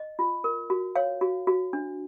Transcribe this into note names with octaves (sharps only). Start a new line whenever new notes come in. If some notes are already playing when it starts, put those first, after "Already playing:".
Already playing: D#5
F4
A#4
F#4
C#5 F5
F#4
F#4
D4